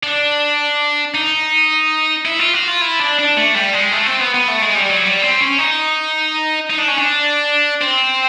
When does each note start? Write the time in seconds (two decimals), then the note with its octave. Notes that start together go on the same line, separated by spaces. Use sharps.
0.03 D4
1.14 D#4
2.25 E4
2.39 F4
2.53 F#4
2.67 F4
2.81 E4
2.99 D4
3.19 D4
3.37 A3
3.56 G3
3.74 G#3
3.92 A3
4.06 C4
4.20 B3
4.34 B3
4.48 A3
4.62 G#3
4.75 G3
4.90 F#3
5.03 G3
5.22 C4
5.40 C#4
5.58 D#4
6.70 D#4
6.78 D4
6.88 C#4
6.97 D4
7.81 C4